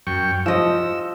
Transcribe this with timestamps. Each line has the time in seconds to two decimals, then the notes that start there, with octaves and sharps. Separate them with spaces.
0.07 F#2 G5 C#6
0.46 F3 D#5 E6